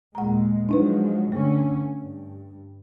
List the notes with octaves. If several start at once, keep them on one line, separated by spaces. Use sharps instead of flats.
D#2 A#2 G#3 F#5 A#5
F3 F#3 G#3 D4 D#4 B4
G2 D3 A3 C#4
G2